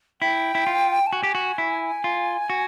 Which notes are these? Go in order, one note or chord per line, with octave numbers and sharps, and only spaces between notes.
E4 G5
E4
F4
A5
F#4 G#5
G4
F#4
E4
F4
F#4